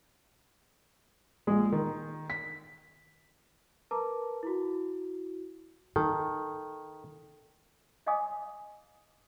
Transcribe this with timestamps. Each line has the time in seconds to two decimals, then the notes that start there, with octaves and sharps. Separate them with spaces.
1.47 A#1 G#3
1.72 D#3
2.30 B6
3.91 A#4 B4 A5 A#5 D6
4.43 E4 F#4
5.96 D#3 A4
8.06 C#5 D#5 F5 G#5 D6 D#6